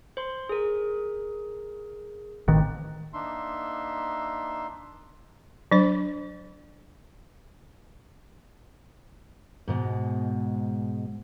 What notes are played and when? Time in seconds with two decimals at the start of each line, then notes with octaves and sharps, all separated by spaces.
0.17 C5 C6
0.49 G#4 A#4
2.48 A1 D#3 C4
3.14 A#3 D4 D#4 E5 C6
5.72 F#3 D4 C5
9.68 G#2 B2 G#3